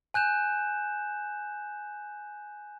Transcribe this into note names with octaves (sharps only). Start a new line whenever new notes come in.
G#5 F#6 G6 E7